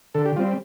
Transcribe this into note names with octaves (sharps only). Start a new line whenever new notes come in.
D3 A4
G4
G3 C4 F4